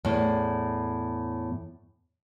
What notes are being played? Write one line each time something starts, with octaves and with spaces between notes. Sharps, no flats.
E2 A2